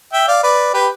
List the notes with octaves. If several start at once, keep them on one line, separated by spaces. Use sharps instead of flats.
E5 G5
D5 F5
B4 D5
G4 B4